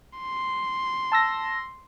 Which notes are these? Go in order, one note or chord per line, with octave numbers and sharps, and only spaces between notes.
C6
A5 E6 A#6